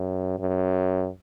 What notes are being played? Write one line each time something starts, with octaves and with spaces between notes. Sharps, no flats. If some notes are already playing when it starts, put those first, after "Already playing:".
Already playing: F#2
F#2